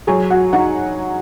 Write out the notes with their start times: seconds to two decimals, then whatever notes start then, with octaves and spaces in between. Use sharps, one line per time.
0.07 F#3 G#4 G#5
0.30 F#4 F#5
0.53 D#4 F#4 F#5